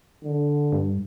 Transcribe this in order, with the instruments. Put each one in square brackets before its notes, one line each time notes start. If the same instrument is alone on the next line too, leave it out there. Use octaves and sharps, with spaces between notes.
[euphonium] D3
[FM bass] G2